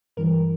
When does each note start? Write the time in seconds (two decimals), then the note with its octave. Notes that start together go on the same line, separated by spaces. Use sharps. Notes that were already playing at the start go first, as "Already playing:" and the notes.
0.17 G2 E3 G3 A#4